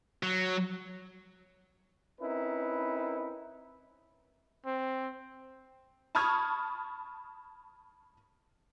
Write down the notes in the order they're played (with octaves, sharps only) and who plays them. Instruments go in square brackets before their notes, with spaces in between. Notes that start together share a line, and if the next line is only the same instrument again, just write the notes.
[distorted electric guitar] F#3
[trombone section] C4 C#4 D#4 E4 A#4 B4
[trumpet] C4
[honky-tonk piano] A5 B5 C#6 D#6 F6 G#6